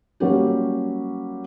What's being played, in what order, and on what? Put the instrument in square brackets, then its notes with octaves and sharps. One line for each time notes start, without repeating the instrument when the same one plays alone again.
[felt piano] F#3 G3 A#3 C#4 G4